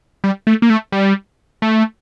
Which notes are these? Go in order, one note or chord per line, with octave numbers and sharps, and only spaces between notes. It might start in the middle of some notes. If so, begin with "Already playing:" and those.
G3
A3
A#3
A3
G3
A3